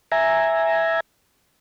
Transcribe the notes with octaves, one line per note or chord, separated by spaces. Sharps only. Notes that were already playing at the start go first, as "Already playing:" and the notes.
E5 G#5 A#5